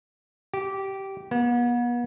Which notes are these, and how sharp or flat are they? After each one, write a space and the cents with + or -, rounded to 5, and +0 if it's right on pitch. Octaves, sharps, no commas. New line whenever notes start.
G4 -15
B3 -40